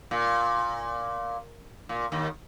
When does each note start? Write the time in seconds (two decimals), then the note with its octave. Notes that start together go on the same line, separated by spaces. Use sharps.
0.11 A#2
1.89 A#2
2.12 D#2 D#3